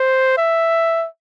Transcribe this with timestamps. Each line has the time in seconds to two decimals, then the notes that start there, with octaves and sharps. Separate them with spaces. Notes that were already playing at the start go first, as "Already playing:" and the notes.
Already playing: C5
0.38 E5